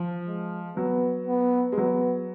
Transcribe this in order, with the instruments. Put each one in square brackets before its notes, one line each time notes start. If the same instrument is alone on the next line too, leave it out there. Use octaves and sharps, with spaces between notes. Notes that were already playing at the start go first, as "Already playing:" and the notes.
Already playing: [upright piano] F3
[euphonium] G#3
[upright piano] F#3 [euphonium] B3
[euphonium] B3
[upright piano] G#3
[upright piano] F#3 [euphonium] B3